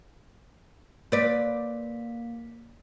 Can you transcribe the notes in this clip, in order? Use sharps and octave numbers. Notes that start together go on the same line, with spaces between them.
A#3 B4 D5 B6